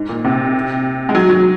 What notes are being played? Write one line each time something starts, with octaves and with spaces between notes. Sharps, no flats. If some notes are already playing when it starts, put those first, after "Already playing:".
Already playing: G#2
A#2
C3
G#3
F#3
F#3